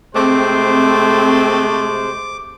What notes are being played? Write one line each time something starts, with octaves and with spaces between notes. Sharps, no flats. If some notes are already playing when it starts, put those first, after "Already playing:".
C3 G#3 A3 C4 C5 D6